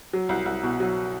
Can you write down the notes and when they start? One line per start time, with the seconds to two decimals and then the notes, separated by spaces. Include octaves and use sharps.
0.13 F#3
0.29 C2
0.46 C2
0.63 B2
0.80 F#3